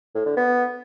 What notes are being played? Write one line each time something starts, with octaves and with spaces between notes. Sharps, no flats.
A2
D3
B3